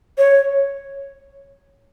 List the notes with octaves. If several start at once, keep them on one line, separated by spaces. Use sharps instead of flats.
C#5